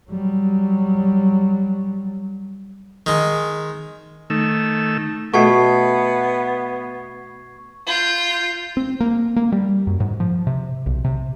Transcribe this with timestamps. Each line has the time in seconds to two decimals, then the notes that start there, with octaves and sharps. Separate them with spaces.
0.11 F#3 G3
3.06 D#3 G#3
4.30 D#3 A3 E6
5.34 B2 A3 B3 C#6 G#6 C7
7.87 F4 G6
8.77 C4
9.00 A#3
9.36 A#3
9.52 G3
9.87 F#2
10.00 G#2
10.20 F3
10.47 C3
10.86 B1
11.04 C3